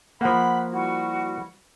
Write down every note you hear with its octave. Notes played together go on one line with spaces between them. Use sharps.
F3 A#3 F#5 B5
G3 E4 F#4